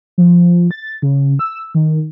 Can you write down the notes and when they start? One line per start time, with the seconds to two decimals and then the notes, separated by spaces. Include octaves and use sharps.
0.18 F3
0.71 A6
1.02 C#3
1.39 E6
1.75 D#3